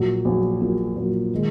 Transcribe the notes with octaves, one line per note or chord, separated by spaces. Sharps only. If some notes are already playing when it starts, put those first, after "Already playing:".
Already playing: A#1 A#2 F#3
A#1 A#2 F#3
A#1 A#2 F#3
A#1 A#2 F#3
D#3 G#3